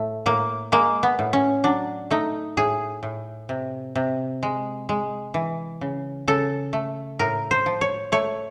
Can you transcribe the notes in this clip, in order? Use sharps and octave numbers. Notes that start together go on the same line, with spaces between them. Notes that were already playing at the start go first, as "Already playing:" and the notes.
Already playing: A2 A3
A2 A#3
G#3 A#3
B3
A2
C#4
F#3 D4
A3 D#4
A2 G#4
A2
C3
C3
G#3
G#3
E3
C#3
C#3 A4
A3
A2 A#4
C5
F3
C#5
A3 C#5